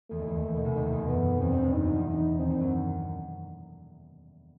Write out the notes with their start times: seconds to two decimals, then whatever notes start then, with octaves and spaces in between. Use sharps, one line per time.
0.11 E2 E3 A3
0.18 D#2 D#3
0.26 E2 E3
0.35 D#2 D#3
0.55 B2
0.65 C2 C3
0.76 D#2 D#3
0.85 C2 C3
0.92 E2 E3
1.00 B2
1.08 F#2 F#3 B3
1.41 E2 E3 C4
1.52 G2 G3
1.63 A2 A3
1.73 G2 G3 D#4
1.84 F#2 F#3
1.95 E2 E3
2.07 D#4
2.39 D#2 D#3 C4
2.50 G2 G3
2.60 F#2 F#3